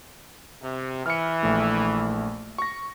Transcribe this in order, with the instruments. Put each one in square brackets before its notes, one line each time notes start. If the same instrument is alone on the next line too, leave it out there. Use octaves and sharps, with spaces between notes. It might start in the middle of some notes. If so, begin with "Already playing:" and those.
[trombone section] C3
[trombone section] E3 [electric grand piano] F6 C#7
[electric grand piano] A#1 A3
C#6 A#6